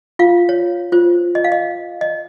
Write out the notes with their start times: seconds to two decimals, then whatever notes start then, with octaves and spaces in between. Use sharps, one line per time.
0.19 F4 F5
0.49 C#5
0.92 F4 C5
1.35 D#5
1.44 F5
1.52 D#5
2.01 D#5